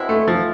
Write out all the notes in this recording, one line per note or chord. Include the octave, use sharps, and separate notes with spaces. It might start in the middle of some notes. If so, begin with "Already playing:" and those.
Already playing: B2 G#3 C4 E4
A3
F3